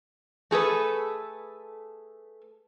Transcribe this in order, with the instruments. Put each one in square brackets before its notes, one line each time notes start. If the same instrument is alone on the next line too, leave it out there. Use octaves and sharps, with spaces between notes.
[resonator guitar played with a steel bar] A3 G#4 A4 B4